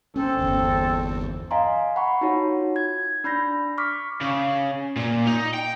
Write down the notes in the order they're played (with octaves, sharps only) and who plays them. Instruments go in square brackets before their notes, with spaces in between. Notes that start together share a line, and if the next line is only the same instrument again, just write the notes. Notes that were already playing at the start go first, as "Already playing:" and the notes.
[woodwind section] C4 A4 [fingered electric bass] C#4
[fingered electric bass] G1 E2
[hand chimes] D#5 F5 G#5 A#5 C6
F#5 B5 C#6
D#4 F4 F#4 C#5
G#6
D4 B5 G6 A#6
C#6 D6 F6 B6
[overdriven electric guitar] C#3
A#2
D#4
G5